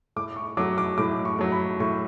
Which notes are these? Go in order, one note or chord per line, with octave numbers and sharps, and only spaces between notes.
A2 D6
C#6
F#3 A3 D6
D6
A2 D6
C#6
F#3 A3
B5
A2 C#6